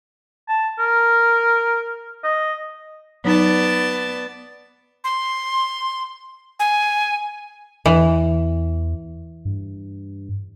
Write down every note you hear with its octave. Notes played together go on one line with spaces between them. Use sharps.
A5
A#4
D#5
F#3 B3 D#4 D5 A5
C6
G#5
E2 E3
G2